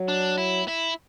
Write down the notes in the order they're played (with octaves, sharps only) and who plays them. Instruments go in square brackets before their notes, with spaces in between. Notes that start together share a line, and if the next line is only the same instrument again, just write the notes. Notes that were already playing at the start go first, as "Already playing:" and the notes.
Already playing: [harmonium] F#3
[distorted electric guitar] D4
E4
E4